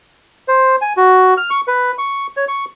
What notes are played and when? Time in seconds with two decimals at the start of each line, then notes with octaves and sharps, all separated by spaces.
0.48 C5
0.81 G#5
0.97 F#4
1.37 F6
1.50 C#6
1.68 B4
1.98 C#6
2.37 C#5
2.48 C#6